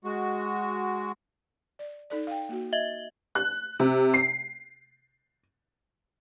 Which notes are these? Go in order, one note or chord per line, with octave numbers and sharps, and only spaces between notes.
G#3 F#4
D5
D#4 A4 D5
F5 G5
A#3 F#4
D#5 E5
F#6
C3
C7